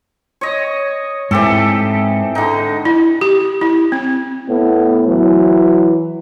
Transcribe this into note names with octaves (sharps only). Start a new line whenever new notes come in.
C#5 D#5
G#2 E3 C4 G4 A4
D3 D#4
E4
G4
E4
C4
A2 B3
E3 F#3